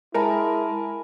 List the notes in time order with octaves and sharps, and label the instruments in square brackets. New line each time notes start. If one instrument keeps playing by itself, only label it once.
[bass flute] G#3 [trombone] E4 [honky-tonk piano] A#4 [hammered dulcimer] G#5 A5 B5